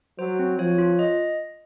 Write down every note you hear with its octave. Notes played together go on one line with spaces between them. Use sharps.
F#3 C5
C4
F3 C#5
F4
D#5